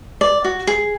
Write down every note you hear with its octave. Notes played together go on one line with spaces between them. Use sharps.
D5
F#4
G#4